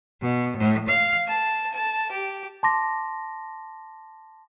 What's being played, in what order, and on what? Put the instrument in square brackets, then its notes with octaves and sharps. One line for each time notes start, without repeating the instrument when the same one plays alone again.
[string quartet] B2
A2
F5
A5
A5
G4
[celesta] A5 C6 D6 A#6